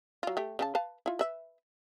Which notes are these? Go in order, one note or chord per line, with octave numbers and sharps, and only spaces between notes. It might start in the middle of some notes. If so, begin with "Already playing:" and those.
F#3 F4
A3 G4
C#3 C4 A5
B4 F5 A5
E4 F4
B4 E5